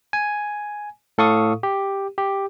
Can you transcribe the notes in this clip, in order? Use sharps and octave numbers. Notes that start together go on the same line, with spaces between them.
G#5
A2 A4 F5 C#6 D#6
G4
G4